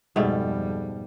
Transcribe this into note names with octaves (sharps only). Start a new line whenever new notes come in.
F2 G#2 B2 G3 A3